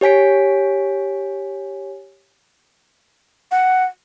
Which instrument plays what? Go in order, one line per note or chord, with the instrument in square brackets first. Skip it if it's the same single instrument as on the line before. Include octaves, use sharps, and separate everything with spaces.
[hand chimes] G4 C#5 G#5 B6 D7
[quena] F#5